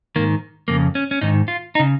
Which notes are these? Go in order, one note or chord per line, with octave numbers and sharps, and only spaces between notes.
G#2 D#3 A#3
F2 C#3 A#3
C#4
C#4
G#2 D#3 D#4
F4
D#4
C#3